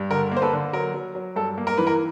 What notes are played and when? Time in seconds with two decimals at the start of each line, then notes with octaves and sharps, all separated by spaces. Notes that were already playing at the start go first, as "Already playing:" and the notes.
Already playing: G2
0.11 D3 A#4
0.31 A#3
0.37 C5
0.42 A4 B4
0.53 D3
0.73 F#3 A#4
0.94 F#3
1.15 F#3
1.36 G2 A4
1.58 A#3
1.67 A#4
1.78 E3 B4
1.87 A#4